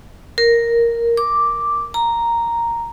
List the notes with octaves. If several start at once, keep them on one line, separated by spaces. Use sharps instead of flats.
A#4
D6
A#5